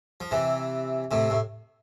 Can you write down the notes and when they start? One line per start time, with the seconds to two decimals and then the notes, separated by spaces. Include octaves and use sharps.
0.20 F3
0.31 C3 E3
1.11 A2 C3
1.30 A2